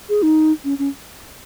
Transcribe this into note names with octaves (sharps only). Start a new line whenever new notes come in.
G#4
D#4
C#4
C#4